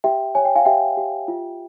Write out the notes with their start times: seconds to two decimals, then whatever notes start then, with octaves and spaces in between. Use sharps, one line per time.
0.04 G4 E5 G5
0.35 C#5 G#5
0.45 G5
0.55 F5 G#5
0.65 G4 E5 G5
0.97 G4
1.28 F4